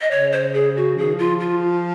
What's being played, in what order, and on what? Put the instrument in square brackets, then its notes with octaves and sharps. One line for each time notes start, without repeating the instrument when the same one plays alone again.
[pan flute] D#5
[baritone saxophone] C#3 [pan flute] C#5
[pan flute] C5
G#4
F#4
[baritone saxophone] F3 [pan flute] G#4
[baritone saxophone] D#3
F3
[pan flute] F4
F4